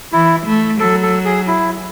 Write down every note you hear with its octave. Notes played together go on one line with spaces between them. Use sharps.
E3 E4
A3
F#3 A4
A4
G#4
E4